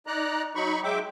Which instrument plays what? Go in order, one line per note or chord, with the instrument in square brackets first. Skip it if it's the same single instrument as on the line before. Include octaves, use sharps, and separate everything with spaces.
[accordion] D#4 D5 A#5 F#6
F#3 D#4 B5 C#6
F#3 G#3 E5 G5 D6